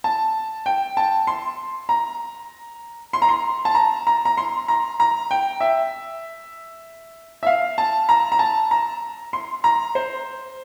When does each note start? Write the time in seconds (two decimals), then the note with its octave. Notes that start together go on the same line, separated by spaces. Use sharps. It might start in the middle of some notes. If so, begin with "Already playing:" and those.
0.04 A5
0.66 G5
0.97 A5
1.27 C6
1.89 A#5
3.13 C6
3.22 A#5
3.29 C6
3.65 A5
3.75 A#5
4.07 A#5
4.25 A#5
4.38 C6
4.68 A#5
5.00 A#5
5.31 G5
5.60 E5
7.43 E5
7.47 F5
7.78 A5
8.09 A#5
8.32 A#5
8.39 A5
8.71 A#5
9.33 C6
9.64 A#5
9.95 C5